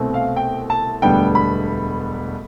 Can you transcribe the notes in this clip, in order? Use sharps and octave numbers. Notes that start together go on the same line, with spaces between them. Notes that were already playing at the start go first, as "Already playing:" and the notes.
Already playing: C2 B2 A3 C4
F5
G5
A5
E1 D2 D3 G3 B3 G5
B5